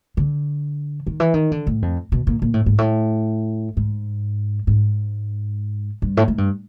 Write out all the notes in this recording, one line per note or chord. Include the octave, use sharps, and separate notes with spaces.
D3
D#3
E3
D#3
D3
A2
F2
B2
A#2
A#2
A2
G#2
A2
G#2
G#2
G2
A2
G#2
G2